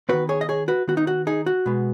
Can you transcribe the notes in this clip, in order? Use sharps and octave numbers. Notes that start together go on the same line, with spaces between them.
D#3 B3 F#4 B4
G#4 C#5
D#5
G#4 C#5
F#4 B4
D#3 B3 F#4
D#4
F#4
D#4 G#4
F#4
B2 G#3 B3